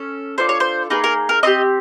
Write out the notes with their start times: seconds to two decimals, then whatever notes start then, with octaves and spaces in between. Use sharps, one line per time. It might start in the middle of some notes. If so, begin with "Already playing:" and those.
Already playing: C#4 A4
0.38 D4 F4 A4 C5
0.49 C#5
0.60 C5
0.90 A#3 D#4 G#4 B4
1.04 A#4
1.29 A#4
1.43 C4 D#4 D#5
1.47 G4